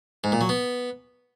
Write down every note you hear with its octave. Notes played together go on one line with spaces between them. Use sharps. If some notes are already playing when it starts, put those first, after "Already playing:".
G#2
A#2
F#3
B3